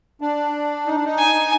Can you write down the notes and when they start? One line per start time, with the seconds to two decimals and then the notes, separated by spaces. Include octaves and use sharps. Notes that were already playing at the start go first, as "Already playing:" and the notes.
0.21 D4
0.86 D#4
0.95 D4
1.05 D#4
1.18 G#5